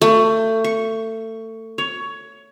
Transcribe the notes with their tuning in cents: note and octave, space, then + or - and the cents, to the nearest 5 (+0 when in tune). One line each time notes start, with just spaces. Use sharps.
A3 +25
C#6 -10
C#5 +15